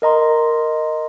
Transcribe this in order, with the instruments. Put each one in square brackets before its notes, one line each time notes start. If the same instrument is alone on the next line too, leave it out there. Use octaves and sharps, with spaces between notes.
[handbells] A#4 D#5 A#5 C6